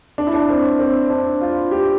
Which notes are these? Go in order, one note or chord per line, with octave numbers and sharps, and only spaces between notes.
D4
E4
D4
C4
C4
D4
F4
G4